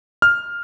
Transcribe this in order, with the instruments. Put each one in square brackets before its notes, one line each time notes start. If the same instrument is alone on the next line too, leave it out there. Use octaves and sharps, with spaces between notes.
[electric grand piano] F6